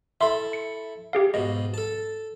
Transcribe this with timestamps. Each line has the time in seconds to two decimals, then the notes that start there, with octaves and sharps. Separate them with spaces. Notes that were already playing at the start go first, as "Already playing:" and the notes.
0.21 E4 A4 E5 C6
0.53 C#7
1.13 G4 G#4 F5
1.34 G#2 B2 D#5
1.74 A4 A5